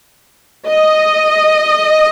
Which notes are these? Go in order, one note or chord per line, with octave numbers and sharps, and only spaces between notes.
D#5